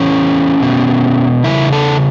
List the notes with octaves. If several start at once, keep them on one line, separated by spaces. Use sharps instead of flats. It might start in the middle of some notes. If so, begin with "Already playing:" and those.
Already playing: E2 E3 C#4
E2 B2
E2 C#3 E4
A4